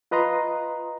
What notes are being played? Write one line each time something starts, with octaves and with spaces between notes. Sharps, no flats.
F4 B4 D#5 A#5 C6